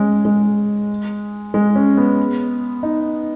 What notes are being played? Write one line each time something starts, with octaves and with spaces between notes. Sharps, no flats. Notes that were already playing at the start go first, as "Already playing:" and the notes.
Already playing: G#3 C#4
G#3
G#3
C#4
B3
D#4